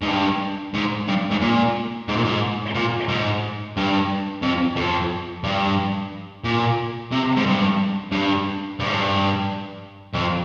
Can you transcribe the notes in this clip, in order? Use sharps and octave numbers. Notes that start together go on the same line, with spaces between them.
G#2
G2
G#2
G2
G#2
A#2
G#2
A#2
G#2
A#2
G#2
G2
F2
F2
G2
A#2
C3
G#2
G2
G2
G2
G#2
G2
F2